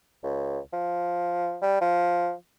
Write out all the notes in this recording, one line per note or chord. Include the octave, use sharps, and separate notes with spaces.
C#2
F3
G3
F3